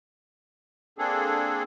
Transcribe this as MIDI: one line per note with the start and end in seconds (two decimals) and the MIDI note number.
0.98 1.63 58
0.98 1.63 60
0.98 1.63 62
0.98 1.63 68
0.98 1.63 69